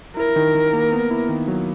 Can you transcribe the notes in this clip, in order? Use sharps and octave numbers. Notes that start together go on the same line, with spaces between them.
E4 A#4
D#3
D#3
A#3
B3
E4
D#3
F#3